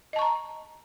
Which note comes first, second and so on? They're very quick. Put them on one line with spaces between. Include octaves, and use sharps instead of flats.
D#5 A5 C#6 A#5